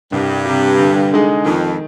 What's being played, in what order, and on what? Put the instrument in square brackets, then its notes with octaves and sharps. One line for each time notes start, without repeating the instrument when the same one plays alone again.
[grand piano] C2 [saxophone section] G2
[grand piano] C3 G3
D2
D3 G#3 D#4 G#4
[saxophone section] F2 [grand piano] D#3